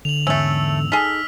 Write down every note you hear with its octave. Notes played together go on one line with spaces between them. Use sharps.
D3 F7 F#7
E2 G#2 A3 C#4 E6
D#4 G#4 A4 F6 B6